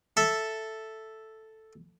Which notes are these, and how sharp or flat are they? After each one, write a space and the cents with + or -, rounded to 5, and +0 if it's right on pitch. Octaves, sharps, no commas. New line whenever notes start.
A4 +0 E5 +0